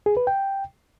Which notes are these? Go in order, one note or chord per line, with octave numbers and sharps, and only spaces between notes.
G#4
B4
G5